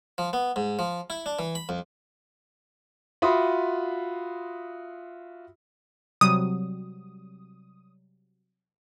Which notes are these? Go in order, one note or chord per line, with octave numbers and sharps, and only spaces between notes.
F3
B3
G#2
F3
E4
D4
E3
B5
F2
F4 F#4 E5 B5 C6 D#6
C3 F#3 G3 D#6